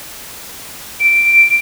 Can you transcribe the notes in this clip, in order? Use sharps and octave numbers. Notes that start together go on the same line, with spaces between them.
D7